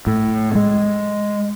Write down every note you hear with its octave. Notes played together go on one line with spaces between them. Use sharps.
A2
G#3